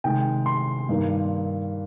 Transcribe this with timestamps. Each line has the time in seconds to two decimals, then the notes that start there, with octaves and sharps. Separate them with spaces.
0.04 C3 D#3 G#3 G5
0.46 C6
0.89 G2 D#3 A#3